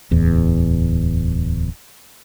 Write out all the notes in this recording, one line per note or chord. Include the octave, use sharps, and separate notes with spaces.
D1 E2